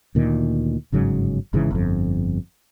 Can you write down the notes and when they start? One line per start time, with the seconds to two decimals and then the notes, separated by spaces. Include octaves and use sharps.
0.15 D2 A#2 D#3
0.92 G1 G#2 C#3 F#3
1.53 G#1 G#2 C#3 E3
1.71 G1 F2